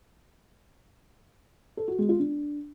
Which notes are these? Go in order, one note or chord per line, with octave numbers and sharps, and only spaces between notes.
A4
F#4
G#3
F4
D4